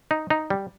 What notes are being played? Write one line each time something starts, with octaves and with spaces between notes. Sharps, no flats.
D#4
D#4
G3